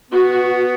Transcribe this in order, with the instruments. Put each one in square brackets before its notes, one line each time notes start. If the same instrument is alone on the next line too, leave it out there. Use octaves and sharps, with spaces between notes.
[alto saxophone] B3 [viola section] F#4